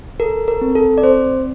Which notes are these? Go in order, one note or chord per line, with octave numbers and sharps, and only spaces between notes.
A4 A#4
A#4
C4
A4
D5
C4 C5